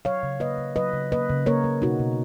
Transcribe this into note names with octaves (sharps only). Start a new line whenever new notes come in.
F#3 C#5 F5
C#3
A#3 B4 D#5
C#3
F#3 B4 D#5
C#3
A#3 B4 D#5
C#3
A#3 A#4 C#5
A#3
B2 D#4 F#4
B2